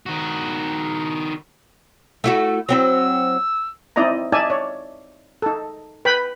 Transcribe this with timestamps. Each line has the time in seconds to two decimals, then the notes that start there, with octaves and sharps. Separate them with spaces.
0.06 D#3 F#4
2.24 A3 E4 F#4
2.69 F#3 C4 E4 E6
3.96 C4 D#4 E4 D5 D#5 A#5
4.32 D#4 D5 E5 G#5 A5
4.50 C#5 D5
5.42 D#4 A4
6.05 B4 G5 B5